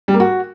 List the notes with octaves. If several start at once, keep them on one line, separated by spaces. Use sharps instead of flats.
G3
A#3
F#4